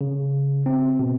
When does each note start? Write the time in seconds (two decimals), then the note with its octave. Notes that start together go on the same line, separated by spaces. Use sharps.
0.01 C#3
0.66 C4
0.99 B2